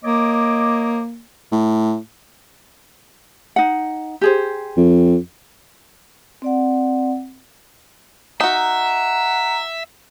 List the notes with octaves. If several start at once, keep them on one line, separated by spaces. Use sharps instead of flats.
A#3 C#5 D#5 D6
A2
D#4 F#5
G4 G#4 C5
F2
C4 D5 F#5
D#4 F#4 E5 F#5 A#5